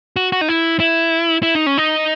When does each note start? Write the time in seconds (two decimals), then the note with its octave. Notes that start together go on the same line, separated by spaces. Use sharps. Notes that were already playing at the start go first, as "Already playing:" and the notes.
0.16 F#4
0.32 F#4
0.41 D#4
0.48 E4
0.80 E4
1.43 E4
1.55 D#4
1.66 C#4
1.77 D#4